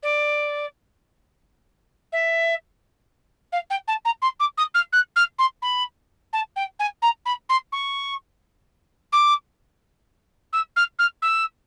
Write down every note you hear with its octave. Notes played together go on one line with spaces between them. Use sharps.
D5
E5
F5
G5
A5
A#5
C6
D6
D#6
F6
F#6
F6
C6
B5
A5
G5
G#5
A#5
B5
C6
C#6
D6
E6
F6
F6
E6